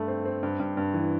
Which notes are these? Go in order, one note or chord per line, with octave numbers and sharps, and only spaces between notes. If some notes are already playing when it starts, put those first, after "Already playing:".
Already playing: G2 A3
C4
C4
G2
G2
G2
E3